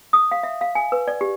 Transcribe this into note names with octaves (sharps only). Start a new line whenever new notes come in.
D#6
F5
E5
F5
G#5
B4
D5
G4